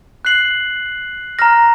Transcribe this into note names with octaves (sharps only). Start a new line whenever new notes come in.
F#6 C7 F#7
A#5 F6 A#6